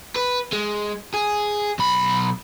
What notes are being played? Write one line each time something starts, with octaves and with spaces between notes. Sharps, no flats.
B4
G#3
G#4
B1 B5